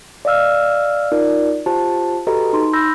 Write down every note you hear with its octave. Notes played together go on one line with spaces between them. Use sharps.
D5 D#5 F5 E6 F6
D#4 F4 A#4 D5
F4 G4 C5 A5
F#4 G4 A4 B4 D#5 A#5
D#4 C6
B5 E6 G6 A#6